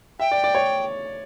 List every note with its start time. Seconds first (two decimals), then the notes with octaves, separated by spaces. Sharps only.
0.20 E5 G5
0.32 D5
0.44 D5
0.55 C#5